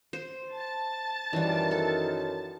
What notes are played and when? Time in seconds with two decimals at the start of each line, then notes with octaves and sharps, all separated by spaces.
0.13 C5
0.52 A5 A6
1.33 F#2 D#3 E3 G3
1.71 A4